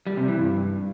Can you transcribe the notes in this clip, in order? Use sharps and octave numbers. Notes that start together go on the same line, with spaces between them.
G3
C3
E3
G2